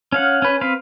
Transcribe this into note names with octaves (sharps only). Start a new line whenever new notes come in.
C#4 F5 F#5
C#4 B4
C4 B4 F5